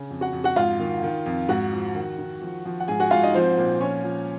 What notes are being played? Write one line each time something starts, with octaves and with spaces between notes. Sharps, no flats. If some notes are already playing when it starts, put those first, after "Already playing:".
Already playing: C#3
F2
F#4 F#5
F2
F#4 F#5
G#2 F4 F5
D#3
D#3
F2
G#2 F#4 F#5
F3
D#3
D#3
F3
F3
F#5
G#2 G#4 G#5
F#4 F#5
G#2 F4 F5
D#4 D#5
F3 C4 C5
A#2
F3 C#4 C#5
F3